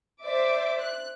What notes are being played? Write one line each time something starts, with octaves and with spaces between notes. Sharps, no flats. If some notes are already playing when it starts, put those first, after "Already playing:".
C5 D5 E5 D6
F#6